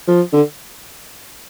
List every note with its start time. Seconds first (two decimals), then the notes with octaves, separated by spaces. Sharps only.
0.08 F3
0.33 D3